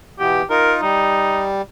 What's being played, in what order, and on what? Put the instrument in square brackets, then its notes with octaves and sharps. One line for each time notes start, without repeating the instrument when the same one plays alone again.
[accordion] B2 E3 B3 [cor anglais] G4
[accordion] D#4 F4 [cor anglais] A#4
[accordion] G3 [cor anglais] D#4